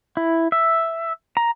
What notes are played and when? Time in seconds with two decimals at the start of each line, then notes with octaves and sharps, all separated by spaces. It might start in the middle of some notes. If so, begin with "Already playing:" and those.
0.17 E4
0.52 E5
1.37 A#5